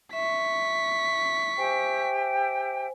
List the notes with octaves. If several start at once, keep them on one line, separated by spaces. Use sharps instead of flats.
E5 C#6 B6
G4 C5 E5 G5 G#5